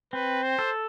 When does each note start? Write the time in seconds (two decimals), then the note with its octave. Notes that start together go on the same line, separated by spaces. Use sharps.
0.13 C4 B4
0.43 C5
0.59 A4